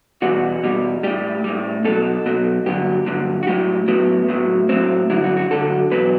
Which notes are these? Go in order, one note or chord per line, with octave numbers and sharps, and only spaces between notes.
E2 B2 G3 F#4
E2 B2 G3
A2 G3 G4
A2 G3
B2 F#3 A4
B2 F#3
G2 D3 F#3 G4
G2 D3 F#3
F#4
A2 F#3 G4
A2 F#3 B3
A2 F#3
A2 F#3 C4
G2 D3 F#3 E4
F#4
F#4
G2 D3 F#3 A4
E2 B2 F#3 B4